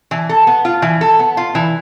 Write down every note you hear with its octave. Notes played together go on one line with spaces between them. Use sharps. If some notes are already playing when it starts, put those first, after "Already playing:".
E3
A4
B3
F4
E3
A4
B3
F4
E3